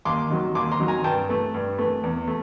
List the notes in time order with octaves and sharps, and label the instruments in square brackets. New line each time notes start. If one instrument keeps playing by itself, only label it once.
[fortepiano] D#2 C6 D6
D#3 F#3
D#2 C6 D6
A#5 C6
D#3 F#3
G#5 A#5
G2 G5 A5
E3 A3
G2
E3 A3
E2
A3